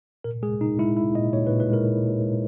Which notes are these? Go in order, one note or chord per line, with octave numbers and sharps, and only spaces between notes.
A#2 A#4
G#3 G#4
A#2 D#4
G#3 E4
G#3 E4
A#2 D#5
A#2 C#5
B4
A#2
B4
G#3 A#4
G#3
A#2
G#3